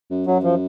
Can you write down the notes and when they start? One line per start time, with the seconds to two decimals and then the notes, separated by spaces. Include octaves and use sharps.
0.10 F#2
0.26 F#2 F#3
0.43 F3